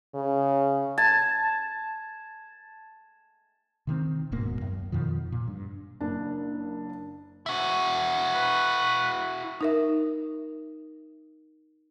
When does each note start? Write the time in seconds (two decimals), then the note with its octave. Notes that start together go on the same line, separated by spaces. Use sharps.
0.15 C#3
0.98 A5 G#6
3.87 C3 D#3 A3 C4
4.32 D1 G#2 B2 A#3
4.61 F#2
4.92 F2 B2 D#3 F3
5.32 A#2
5.47 G2
6.01 F#1 D4
7.46 E4 F#4
8.35 B4
9.61 D#4 A#4 E5